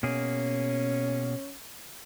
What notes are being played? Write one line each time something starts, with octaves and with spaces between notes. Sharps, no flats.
B2 A#3 C#4 G#4